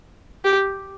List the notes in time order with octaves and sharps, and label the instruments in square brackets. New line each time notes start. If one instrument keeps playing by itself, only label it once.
[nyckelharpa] G4